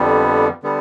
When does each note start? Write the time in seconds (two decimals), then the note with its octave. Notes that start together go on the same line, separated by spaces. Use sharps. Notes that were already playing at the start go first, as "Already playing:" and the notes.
Already playing: F2 D3 G3 B3
0.63 D3 G3 B3